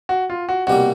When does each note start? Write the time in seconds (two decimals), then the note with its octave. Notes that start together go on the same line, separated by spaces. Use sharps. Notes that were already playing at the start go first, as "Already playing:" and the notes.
0.09 F#4
0.30 F4
0.49 F#4
0.67 C2 B2 G3 A#3 F#4